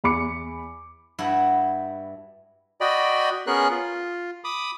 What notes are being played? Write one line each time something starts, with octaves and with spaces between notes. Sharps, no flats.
E2 B5 D6 C#7
G2 E4 F#4 F#5
F#4 D5 D#5 G5 B5
B3 C#4 G#4 A#4 F#6
F4
B5 D6 D#6